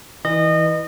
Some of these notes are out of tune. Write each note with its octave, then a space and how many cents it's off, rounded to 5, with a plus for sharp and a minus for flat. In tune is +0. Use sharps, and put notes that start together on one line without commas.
E3 -20 D#5 -25